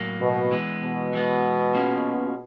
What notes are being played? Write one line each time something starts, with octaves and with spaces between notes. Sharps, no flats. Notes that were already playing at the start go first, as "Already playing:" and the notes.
Already playing: A2 F#3 A#3
B2
E3 G#3 B3
B2
E3 G#3 B3
A#3 C#4 F4 G#4 C#5